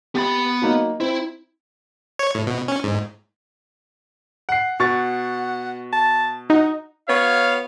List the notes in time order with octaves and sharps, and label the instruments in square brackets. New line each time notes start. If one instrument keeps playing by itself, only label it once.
[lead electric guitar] B3 B5 [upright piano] G4 A6
[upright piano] F#3 A#3 D#4
[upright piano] C4 [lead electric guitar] E4
[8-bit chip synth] C#5
A2
B2
C#4
G#2
[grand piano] F#5 C7
[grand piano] B2 C#6 A6 [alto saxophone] F#5
[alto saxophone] A5
[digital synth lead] D#4 [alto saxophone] F#4
[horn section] B3 F#4 C#5 [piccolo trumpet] F5